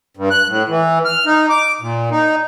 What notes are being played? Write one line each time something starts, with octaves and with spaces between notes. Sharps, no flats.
G2
F#6
A2
E3
F6
D#4
D6
A#2
D#4